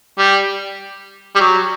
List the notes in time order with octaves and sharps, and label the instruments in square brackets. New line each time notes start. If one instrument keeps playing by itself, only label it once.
[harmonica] G3
G3
F#3